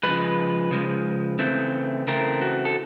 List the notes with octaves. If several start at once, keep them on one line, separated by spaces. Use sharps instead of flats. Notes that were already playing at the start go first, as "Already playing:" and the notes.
C#3 F3 G#3 B4
C#3 F3 G#3
C#3 E3 A3 C4
C#3 E3 A3 C4 A#4
F#4
A4